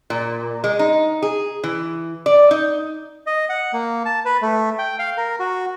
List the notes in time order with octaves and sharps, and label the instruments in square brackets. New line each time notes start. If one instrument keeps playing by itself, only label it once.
[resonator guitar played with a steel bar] A#2
G#3
D#4
G#4
E3
D5
D#4
[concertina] D#5
F#5
A#3
A5
B4
A3
G5
F5
A#4
F#4